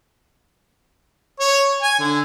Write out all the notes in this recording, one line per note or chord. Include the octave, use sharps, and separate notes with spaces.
C#5
G#5
D3